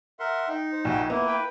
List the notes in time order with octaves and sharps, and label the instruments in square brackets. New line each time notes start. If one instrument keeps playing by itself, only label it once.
[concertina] A#4 [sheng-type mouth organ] E5 F#5 C6
[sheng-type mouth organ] D#4 [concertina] G5
[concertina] C5
[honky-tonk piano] A#1 [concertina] F#4 G5 G#5
[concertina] A#3 E4 [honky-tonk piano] B3
[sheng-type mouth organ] B4 G5